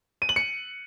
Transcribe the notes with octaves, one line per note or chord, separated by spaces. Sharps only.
D#7
F#7
C#7